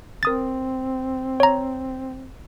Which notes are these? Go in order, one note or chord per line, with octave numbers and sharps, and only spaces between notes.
C4 A#4 D#6 A6
C#5 A#5